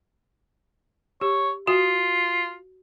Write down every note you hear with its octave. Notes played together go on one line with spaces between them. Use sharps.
G4 C#5
F4 F#4